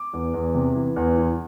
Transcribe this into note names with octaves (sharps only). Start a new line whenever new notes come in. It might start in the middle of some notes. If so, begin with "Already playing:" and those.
Already playing: D6
E2
E2
C3
E3
E2
E3